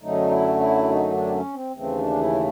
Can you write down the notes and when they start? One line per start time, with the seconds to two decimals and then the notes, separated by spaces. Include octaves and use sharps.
0.02 F#2 D3 F#3 A3 D#4
0.31 E4
0.60 E4
0.89 D#4
1.10 D4
1.28 C4
1.32 C#4
1.54 C4
1.76 D#2 C#3 E3 A3 C4
1.97 D4
2.19 E4